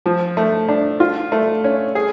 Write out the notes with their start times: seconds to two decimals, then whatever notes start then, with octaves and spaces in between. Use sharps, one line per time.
0.06 F3
0.37 A3
0.69 D4
1.00 F4
1.32 A3
1.64 C#4
1.95 G#4